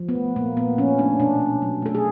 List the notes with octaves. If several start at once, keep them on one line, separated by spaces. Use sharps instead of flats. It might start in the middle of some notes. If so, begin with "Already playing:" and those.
Already playing: F3
B3
A3
A#2 A#3
A#2 B3
F3 C#4
A3 D4
B2 D4
B2
F#3
A3 A4
G#4